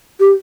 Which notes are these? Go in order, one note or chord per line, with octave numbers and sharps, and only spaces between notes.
G4